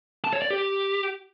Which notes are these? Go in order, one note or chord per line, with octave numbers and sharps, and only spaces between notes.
A5
C#5
D5
G4